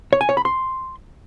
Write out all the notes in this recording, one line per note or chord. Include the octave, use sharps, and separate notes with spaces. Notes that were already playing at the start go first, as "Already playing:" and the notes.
C#5
G#5
C#5
B5
C6